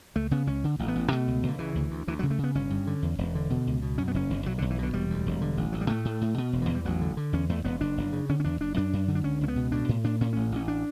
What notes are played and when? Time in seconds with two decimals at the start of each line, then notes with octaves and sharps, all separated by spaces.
0.16 C#2 A3
0.31 C#3 B3
0.47 C#2 C#4
0.64 D3
0.79 A1
0.88 B3
0.96 A1
1.11 B2 A3
1.28 C#2
1.43 C#2
1.48 D3
1.59 C#3 E3
1.75 D2
1.91 D2
2.07 D2 E3
2.19 C#3 F#3
2.31 A3
2.39 C#3
2.44 B3
2.55 G1 C#4
2.70 G2
2.87 D3
3.02 E2
3.18 E1
3.35 D3
3.50 B2
3.67 C#2
3.82 B2
3.98 F#2 C#4
4.08 B3
4.14 F#1 C#4
4.30 F#1
4.46 B1 F#3
4.58 B1 D3
4.70 E3
4.78 B2 D3
4.93 E1 G3
5.10 D2
5.26 E1
5.41 D3
5.57 A1
5.73 A1 F#3
5.81 G3
5.90 A2 A3
6.05 A2
6.21 A2
6.38 B2
6.53 E1
6.62 E3
6.69 E2
6.75 G3
6.85 A1 F#3
7.01 D3
7.17 D3
7.33 E2 C#4
7.49 E2 A3
7.65 E1 B3
7.81 F#1 D4
7.98 F#1
8.13 C#3
8.29 D3 C#4
8.40 C#4
8.44 E2 D4
8.61 F#1 D4
8.77 F#2 D4
8.93 F#2
9.08 D3
9.15 D4
9.24 C#2 C#4
9.41 C#2 C#4
9.48 B3
9.56 B2
9.72 A2 D4
9.89 A2
10.04 A2 D4
10.21 A2 C#4
10.33 A1 C#4
10.52 A1 C#4
10.68 D4